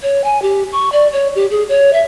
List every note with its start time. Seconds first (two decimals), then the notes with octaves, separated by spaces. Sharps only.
0.03 C#5
0.24 G#5
0.42 G4
0.72 C#6
0.92 D5
1.12 C#5
1.35 G4
1.50 G#4
1.68 C#5
1.93 E5